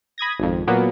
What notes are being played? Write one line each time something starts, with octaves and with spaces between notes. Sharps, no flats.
B5 D#6 G#6 A#6
G#1 F2
A#2 F#3 A#3 B3